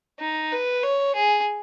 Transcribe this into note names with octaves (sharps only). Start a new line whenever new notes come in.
D#4
B4
C#5
G#4